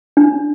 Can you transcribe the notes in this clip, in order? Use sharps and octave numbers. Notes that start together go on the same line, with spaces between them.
D4